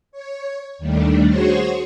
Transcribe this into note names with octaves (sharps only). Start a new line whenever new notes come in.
C#5
D#2 D#3 G3 A3 D4
F#4 G#4 C5 C#5 C6 C#6